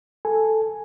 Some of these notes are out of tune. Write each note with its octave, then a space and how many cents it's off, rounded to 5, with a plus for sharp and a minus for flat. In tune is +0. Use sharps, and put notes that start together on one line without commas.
A4 +0 G#5 +0